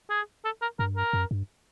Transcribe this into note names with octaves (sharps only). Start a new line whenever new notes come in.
G#4
A4
A#4
G2 A#4
A#4
F#2
G2